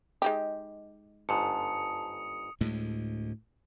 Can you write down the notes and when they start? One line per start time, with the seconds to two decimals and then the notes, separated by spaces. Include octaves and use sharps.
0.22 G#3 D#4 G4
1.29 G1 G#2 A5 D#6 C#7
2.61 D2 A2 G#3